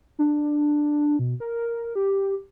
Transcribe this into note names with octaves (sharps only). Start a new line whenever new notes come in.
D4
B2
A#4
G4